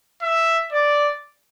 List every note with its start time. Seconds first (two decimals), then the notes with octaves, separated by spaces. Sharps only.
0.22 E5
0.72 D5